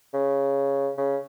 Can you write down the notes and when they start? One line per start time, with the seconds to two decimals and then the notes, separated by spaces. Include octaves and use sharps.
0.14 C#3
0.98 C#3